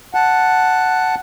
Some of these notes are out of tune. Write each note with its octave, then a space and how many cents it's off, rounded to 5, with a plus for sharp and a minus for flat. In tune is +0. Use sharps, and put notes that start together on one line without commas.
F#5 +0 A5 +0